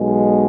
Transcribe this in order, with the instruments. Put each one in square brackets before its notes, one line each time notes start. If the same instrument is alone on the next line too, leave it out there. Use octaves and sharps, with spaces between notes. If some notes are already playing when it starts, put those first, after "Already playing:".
Already playing: [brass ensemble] B1 B2 G#3